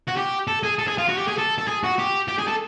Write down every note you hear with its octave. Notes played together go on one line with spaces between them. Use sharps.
F#4
G4
A4
G#4
A4
G#4
F4
F#4
G4
G#4
A4
A4
G#4
F#4
G4
G4
G#4
A4